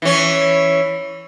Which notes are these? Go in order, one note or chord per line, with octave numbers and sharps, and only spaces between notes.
E3 C#4